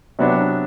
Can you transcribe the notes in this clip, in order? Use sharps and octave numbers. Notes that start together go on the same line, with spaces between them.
C3 F#3 B3 D4